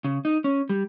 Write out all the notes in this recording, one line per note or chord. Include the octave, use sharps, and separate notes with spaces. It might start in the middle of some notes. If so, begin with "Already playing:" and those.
C#3
D#4
C#4
G3